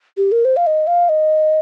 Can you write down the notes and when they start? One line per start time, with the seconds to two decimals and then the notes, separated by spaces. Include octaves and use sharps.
0.17 G4
0.32 A#4
0.45 C5
0.57 F5
0.67 D#5
0.87 F5
1.09 D#5